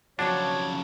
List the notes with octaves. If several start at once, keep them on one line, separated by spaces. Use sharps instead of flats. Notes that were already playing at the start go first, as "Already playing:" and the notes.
F2 C#3 F3 F#3 D4 F#4 C#5